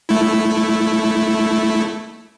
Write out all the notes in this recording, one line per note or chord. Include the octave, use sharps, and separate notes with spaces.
A3 E4